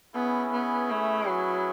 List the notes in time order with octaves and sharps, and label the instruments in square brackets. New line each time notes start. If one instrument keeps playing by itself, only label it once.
[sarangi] B3 [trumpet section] C#4 E4 G#4 B4
[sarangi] B3
A3
F#3